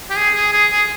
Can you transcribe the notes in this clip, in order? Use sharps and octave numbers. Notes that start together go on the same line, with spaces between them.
G4
G#4
G#4
G#4
G#4